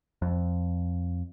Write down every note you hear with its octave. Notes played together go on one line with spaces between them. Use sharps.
F2